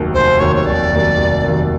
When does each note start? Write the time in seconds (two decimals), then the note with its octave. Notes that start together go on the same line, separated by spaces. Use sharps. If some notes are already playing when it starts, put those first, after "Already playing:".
Already playing: F1 D#2 D#3 F#3 A#3
0.14 F1 C5
0.40 D#2 D#3 F#3 A#3 C#5
0.56 C#5
0.66 F1 D5
0.92 D#2 D#3 F#3 A#3
1.18 F1
1.43 D#2 D#3 F#3 A#3